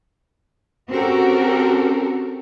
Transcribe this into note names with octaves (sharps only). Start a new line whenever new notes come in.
C4 C#4 F#4 G4 A4 A#4